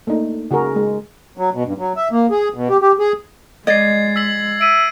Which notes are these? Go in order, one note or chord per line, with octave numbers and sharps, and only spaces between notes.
A3 A#3 D4 D#4
C#3 F#4 G#4 A#4
G#3
F#3
B2
G2
F#3
E5
A#3
G#4
B2
G4
G4
G#4
G#3 D5 D#5 G#6 A6 C7
E6 B6 F#7
E5 D7 D#7